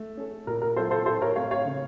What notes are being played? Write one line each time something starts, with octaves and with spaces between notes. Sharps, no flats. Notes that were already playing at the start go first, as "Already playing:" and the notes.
Already playing: A3
C#4 A4
A#2 A#4
A#4
F#3 C4 F4 A4 C5
A4 C5
A2 A4 C5
A#4 C#5
A3 C4 C#5 F5
C#5 F5
C#3